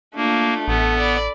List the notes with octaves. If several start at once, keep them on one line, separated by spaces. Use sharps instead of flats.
A3 A#3 D4 F4
A1 B3 A4
D5 B5